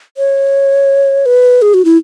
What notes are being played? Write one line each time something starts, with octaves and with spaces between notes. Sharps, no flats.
C#5
B4
G#4
F#4
E4